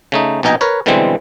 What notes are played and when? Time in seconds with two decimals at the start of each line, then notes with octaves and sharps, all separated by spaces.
0.12 C#3 A3 D#4
0.43 A#1 B2 D#4 D#5 G5 G#5
0.61 A#4 B4 C#5
0.86 B2 D3 E3 G3 G#3 C4